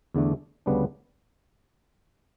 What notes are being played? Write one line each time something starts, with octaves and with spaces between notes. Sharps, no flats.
E2 D3 A3 D4
D2 C#3 G3 B3 D4